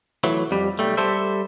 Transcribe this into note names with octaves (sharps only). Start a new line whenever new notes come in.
E3 F#3 A3
F2 G3
B1 G3 A3
G3 A4 C5 E5